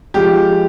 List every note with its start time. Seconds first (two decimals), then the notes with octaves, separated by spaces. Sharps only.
0.14 F3 G#3 G4